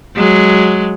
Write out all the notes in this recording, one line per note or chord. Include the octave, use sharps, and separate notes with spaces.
F#3 G#3